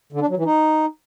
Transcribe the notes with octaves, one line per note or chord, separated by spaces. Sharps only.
D3
D4
F#3
E3
D#4